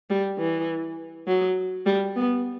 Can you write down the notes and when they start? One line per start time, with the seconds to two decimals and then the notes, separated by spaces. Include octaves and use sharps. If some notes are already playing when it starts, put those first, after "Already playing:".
0.10 G3
0.39 E3
1.27 F#3
1.86 G3
2.16 B3